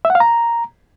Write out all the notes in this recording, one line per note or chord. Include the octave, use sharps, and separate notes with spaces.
E5
F#5
F5
A#5